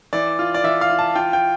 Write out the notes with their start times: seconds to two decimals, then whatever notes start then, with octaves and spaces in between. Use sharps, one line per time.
0.13 E3 D5
0.39 F4
0.54 D5
0.64 E3 E5
0.81 F5
0.90 F4
0.99 A5
1.15 F4 G5
1.33 G5